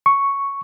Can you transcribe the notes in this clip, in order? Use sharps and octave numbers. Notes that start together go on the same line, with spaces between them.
C#6